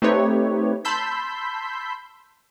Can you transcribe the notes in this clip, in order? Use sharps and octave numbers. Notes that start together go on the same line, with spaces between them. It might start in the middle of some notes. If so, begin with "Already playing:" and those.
A3 C4 D#4 G4 B4 C#5
A5 B5 C6 E6 G6 B6